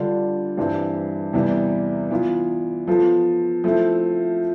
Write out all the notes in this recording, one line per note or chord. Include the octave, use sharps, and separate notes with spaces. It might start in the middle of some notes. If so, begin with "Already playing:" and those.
Already playing: D3 G3 D4 F4
G2 E3 G3 C4
E2 C3 E3 G3
E3 B3 F4
F3 B3 F4 A4
F3 A3 C4 E4